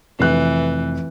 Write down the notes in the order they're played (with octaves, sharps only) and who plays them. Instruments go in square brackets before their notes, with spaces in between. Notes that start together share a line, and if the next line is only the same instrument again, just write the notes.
[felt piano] F1 F#6 [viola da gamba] E3